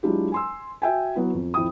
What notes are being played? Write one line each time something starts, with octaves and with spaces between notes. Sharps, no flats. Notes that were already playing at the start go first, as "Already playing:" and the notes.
F#3 G#3 D4 E4 F4 G4
G#5 C6 E6
F#4 E5 G5 G#5
F#3 B3 E4
F2
F2 E4 G5 D#6